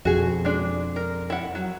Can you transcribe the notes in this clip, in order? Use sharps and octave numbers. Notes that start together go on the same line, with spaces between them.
F2 B2 F#4 G#4
G#3 D4
A#4
E4 F#5
F#3